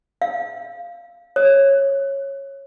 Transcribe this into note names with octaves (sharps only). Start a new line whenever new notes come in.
F5
C#5